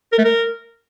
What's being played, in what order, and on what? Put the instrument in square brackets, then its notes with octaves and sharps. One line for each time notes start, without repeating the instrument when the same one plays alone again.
[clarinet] A#4
A3
A#4